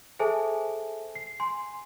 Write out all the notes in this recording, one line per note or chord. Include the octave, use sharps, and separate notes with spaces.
G#4 A4 C5 E5 G#5 A5
C7
G#5 C6